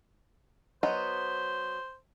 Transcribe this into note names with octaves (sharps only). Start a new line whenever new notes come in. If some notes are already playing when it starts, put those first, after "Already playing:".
F#3 B3 C5 D#5